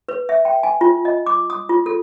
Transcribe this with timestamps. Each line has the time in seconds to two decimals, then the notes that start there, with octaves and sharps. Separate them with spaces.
0.09 B4
0.29 E5
0.45 G5
0.63 G#5
0.81 F4
1.05 D#5
1.26 D6
1.50 D#6
1.69 F4
1.86 A4